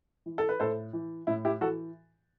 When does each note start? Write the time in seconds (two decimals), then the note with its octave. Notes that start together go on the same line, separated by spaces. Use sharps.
0.26 E3
0.38 A4
0.49 B4
0.60 A2 A4 C5
0.93 E3
1.27 A2 E4
1.45 E4 G4
1.61 E3 F#4 A4